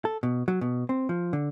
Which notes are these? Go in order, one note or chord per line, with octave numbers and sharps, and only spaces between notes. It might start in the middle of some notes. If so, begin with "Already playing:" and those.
A4
B2
F#3
B2
C4
F3
D3